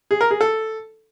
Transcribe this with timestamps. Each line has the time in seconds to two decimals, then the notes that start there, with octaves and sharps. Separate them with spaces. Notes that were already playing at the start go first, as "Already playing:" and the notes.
0.11 G#4
0.21 A#4
0.31 G#4
0.41 A4